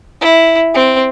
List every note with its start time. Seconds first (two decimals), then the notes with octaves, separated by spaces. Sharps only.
0.21 E4
0.74 C4